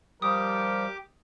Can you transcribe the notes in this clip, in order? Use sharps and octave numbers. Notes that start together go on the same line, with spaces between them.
F3 G3 G4 A#4 D6 D#6